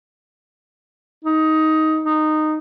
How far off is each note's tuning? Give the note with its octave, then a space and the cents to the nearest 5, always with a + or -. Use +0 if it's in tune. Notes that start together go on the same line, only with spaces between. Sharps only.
D#4 +15
D#4 -15